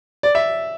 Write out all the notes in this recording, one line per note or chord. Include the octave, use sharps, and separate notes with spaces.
D5
E5